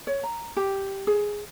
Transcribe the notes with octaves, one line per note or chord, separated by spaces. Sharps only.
C#5
A#5
G4
G#4